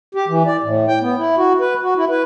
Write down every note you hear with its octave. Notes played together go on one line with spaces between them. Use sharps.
G4
E3
D5
A2
G5
B3
E4
F#4
B4
F#4
E4
B4